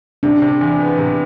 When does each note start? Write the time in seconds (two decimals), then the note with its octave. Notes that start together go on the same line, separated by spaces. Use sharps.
0.23 C3 D4
0.42 C3
0.61 E2
0.80 B3
0.98 C3